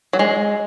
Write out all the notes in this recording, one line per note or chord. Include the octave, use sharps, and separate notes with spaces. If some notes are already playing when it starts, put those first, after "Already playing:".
F#3
G#3